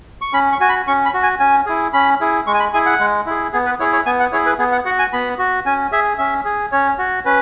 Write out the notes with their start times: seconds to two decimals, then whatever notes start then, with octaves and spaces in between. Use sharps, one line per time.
0.21 C#6
0.33 C#4 B5
0.52 C#6
0.60 F#4 G#5
0.69 B5
0.87 C#4 C#6
1.05 B5
1.14 F#4
1.23 G#5
1.40 C#4 G#5
1.66 E4 G#4
1.93 C#4 B5
2.20 E4 G#4
2.47 G#3 C#6
2.54 G#5
2.60 B5
2.73 E4 G#4 G#5
2.86 F#5
3.00 G#3
3.26 E4 G#4
3.53 B3 G#4
3.66 B4
3.80 E4 G#4 C#5
3.93 C#5
4.06 B3 G#5
4.20 F#5
4.32 E4 G#4 C#5
4.46 B4
4.59 B3 G#4
4.72 F#5
4.85 F#4 F#5
4.99 G#5
5.13 B3 B5
5.39 F#4
5.66 C#4 G#5
5.92 G#4 E5
6.18 C#4 E5
6.45 G#4
6.72 C#4 C#5
6.98 F#4
7.25 C#4 B4